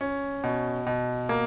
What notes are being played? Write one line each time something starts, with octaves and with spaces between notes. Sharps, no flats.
C#4
B2
B2
A#3